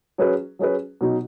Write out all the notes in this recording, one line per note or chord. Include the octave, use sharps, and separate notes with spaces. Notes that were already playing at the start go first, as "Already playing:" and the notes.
F#3 C#4 G#4 B4
F#3 C#4 G#4 B4
B2 F#3 D#4